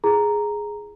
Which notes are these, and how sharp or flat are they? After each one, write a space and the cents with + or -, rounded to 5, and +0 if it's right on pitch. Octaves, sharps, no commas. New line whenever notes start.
E4 +35 G#4 +0 A#5 +0